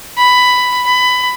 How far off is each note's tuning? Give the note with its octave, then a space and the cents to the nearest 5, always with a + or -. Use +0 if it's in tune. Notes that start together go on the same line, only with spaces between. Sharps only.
B5 +10
B5 +20